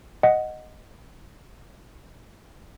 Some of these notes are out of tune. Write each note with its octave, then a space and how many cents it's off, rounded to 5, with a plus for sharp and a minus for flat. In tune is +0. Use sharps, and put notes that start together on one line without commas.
D#5 +0 F#5 +0